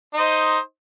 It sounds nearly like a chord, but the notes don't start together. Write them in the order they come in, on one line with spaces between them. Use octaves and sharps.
D#4 D#5 C5